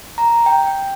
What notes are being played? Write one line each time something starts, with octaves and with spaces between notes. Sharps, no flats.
A#5
G5
G5